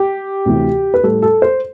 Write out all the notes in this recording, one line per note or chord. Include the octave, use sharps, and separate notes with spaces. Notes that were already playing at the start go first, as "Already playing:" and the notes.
Already playing: G4
D2 C3 E3
B4
A2 G3 A4
A4
C5